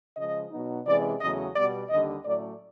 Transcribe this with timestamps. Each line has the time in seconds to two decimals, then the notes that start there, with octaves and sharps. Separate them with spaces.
0.17 C#3 F3 G#3 D#5
0.51 B2 F#3 B3 D#4
0.86 C3 E3 G#3 C#4 D5
1.21 E2 C#3 F#3 A3 D#5
1.55 B2 G3 B3 D5
1.90 D#2 D3 G3 D#5
2.25 A2 F#3 A3 C#4 D5